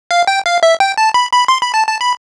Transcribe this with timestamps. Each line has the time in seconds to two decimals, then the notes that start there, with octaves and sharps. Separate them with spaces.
0.11 F5
0.27 G5
0.46 F5
0.63 E5
0.80 G5
0.98 A5
1.14 B5
1.32 B5
1.48 C6
1.62 B5
1.74 A5
1.87 A5
2.01 B5